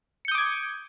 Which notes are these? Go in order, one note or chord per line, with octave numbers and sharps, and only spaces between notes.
D6 D#6 G6 G#6 C#7